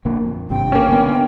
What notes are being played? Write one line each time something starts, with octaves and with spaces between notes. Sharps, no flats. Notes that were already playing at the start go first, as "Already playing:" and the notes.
A#1 D3 A#3
F2
G#1 G2 C3 G5
A#3 C#4
D3 B3
D3 B3